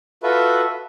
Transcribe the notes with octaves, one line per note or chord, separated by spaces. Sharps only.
F4 F#4 A4 B4 E5